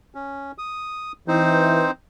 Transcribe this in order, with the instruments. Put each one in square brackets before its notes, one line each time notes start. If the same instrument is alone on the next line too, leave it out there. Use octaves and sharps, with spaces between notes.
[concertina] C#4
D#6
[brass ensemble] E3 [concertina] C4 D#4 C5